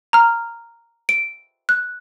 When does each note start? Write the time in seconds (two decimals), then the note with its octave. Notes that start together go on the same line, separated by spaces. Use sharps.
0.13 A#5 F6
1.09 D7
1.69 F#6